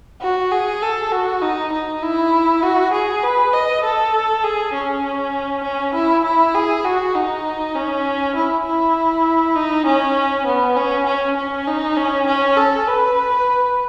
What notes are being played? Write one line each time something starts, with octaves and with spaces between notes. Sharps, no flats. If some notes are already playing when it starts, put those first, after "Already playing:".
F#4
G#4
A4
F#4
D#4
D#4
E4
F#4
G#4
B4
D#5
A4
G#4
C#4
C#4
E4
E4
G#4
F#4
D#4
C#4
E4
E4
D#4
C#4
B3
C#4
C#4
C#4
D#4
C#4
C#4
A4
B4